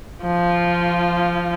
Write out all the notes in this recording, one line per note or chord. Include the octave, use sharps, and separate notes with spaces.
F3 F4